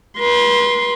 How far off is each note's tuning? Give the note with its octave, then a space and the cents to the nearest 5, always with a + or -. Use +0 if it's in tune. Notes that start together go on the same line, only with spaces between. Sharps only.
B4 -40 C6 +0